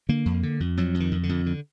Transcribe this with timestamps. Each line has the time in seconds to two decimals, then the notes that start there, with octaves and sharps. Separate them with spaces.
0.09 D3 A#3
0.26 F2
0.43 D3
0.60 F2
0.77 F2 F#3
0.94 F2
1.00 D#3
1.12 F2
1.23 D3
1.29 F2
1.46 D3